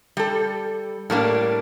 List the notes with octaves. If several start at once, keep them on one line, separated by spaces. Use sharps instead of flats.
G3 A4
A2 G3 A#3 D4